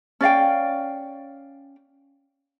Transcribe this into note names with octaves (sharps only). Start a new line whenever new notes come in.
C#4 D5 F5 G5